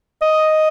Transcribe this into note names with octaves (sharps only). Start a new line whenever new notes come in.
D#5